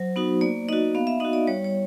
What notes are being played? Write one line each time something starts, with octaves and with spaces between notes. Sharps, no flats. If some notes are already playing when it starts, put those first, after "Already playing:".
Already playing: F#3 C5
B3 D#4 F#4
A#3 D5
D#4 F#4 D#5
B3 F5
E5
D#4 F#4 D#5
D5
G3 C#5
C#5